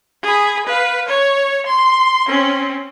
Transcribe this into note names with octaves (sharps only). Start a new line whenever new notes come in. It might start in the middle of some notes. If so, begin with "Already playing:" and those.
G#4 B5
B4 F5
C#5
C6
C4 C#4